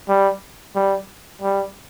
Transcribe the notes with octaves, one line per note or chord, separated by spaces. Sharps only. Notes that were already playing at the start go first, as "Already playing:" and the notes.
G3
G3
G3